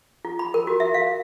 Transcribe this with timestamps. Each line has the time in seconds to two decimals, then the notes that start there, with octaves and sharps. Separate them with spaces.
0.25 F4
0.39 B5
0.54 A#4
0.67 F#4
0.80 E5
0.94 F5